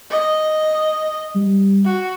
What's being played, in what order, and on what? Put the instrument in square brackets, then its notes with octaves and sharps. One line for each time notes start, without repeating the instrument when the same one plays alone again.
[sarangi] D#5
[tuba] G3
[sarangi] F#4